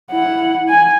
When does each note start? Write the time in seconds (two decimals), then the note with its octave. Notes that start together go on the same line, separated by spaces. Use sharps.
0.11 E4 F#5
0.69 G#5